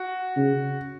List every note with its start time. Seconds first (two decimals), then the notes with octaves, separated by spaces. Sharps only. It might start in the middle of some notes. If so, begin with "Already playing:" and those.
Already playing: F#4
0.36 C#3